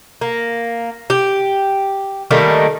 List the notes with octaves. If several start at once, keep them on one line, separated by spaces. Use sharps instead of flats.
A#3
G4
D#3 G3 A3 A#3